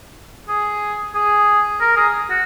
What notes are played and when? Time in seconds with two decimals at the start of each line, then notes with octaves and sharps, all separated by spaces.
0.49 G#4
1.15 G#4
1.81 A#4
1.96 G#4
2.30 F#4